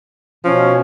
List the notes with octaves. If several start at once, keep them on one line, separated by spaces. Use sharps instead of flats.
B2 F3 C#4